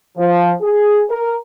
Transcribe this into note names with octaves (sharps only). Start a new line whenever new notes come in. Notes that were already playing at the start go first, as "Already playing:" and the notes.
F3
G#4
A#4